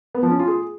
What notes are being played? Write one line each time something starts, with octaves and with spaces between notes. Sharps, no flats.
B3
F3
C#4
F4
G#4